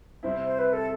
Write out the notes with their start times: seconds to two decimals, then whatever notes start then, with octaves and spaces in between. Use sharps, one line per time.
0.23 C3 G3 C4 E4 C5
0.45 C5
0.59 B4
0.73 A4